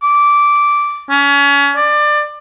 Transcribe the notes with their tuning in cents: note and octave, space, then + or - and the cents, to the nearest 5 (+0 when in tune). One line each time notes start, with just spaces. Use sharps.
D6 -10
C#4 +30
D5 +25